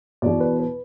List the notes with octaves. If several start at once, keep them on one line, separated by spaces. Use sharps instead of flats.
E2 B2 D5
B4
B4